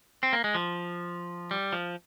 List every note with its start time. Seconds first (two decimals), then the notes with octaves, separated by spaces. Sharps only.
0.23 C4
0.33 A#3
0.44 G#3
0.55 F3
1.51 G3
1.73 F3